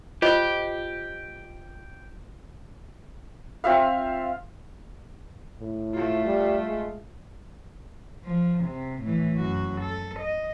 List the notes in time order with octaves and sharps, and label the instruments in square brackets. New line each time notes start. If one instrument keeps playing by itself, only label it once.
[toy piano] F4 C5 D#5 [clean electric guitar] G4
[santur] C4 F4 E5 F5
[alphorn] A2
[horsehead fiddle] A3 F4
[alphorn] G3
G#3
[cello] F3
C3
A2 E3
F#2 F#4
A4
D#5